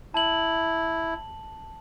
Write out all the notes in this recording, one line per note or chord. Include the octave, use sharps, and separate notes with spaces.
E4 A5 F#7